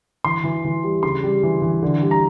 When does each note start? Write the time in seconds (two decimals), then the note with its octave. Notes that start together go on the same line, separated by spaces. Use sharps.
0.24 E3 C6
0.44 E3
0.64 E3
0.84 G3
1.03 C#3 C6
1.24 G3
1.43 E3
1.62 E3
1.82 D3
2.02 G3
2.11 A#5